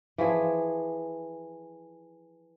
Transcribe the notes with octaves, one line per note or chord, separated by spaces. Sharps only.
E3 F3 G#4